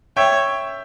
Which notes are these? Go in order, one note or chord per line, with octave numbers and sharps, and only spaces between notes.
C#5 E5 G5